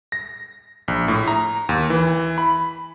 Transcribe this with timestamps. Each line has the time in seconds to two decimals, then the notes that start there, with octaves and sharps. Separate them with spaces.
0.12 A#6
0.88 A#1
1.08 A2
1.28 A#5
1.69 D#2
1.90 E3
2.38 B5